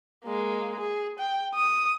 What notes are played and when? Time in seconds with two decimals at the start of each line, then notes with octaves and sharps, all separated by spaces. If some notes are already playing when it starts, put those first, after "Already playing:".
0.25 G#3 A#3
0.80 G#4
1.19 G5
1.54 D#6